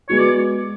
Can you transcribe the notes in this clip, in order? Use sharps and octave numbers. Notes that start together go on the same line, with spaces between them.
G#3 B3 F#4 C#5
D5